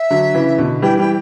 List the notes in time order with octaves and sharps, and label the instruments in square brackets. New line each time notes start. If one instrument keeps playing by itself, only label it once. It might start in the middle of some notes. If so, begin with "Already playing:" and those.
Already playing: [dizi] E5
[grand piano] D3 F#3
C#3 E3
B2 D3
[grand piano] E3 G3 [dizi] G5
[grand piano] E3 G3 [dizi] G5